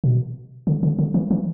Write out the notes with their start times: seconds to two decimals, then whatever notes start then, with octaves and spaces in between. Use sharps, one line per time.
0.04 B2
0.67 D3
0.83 D3
0.99 D3
1.14 E3
1.31 E3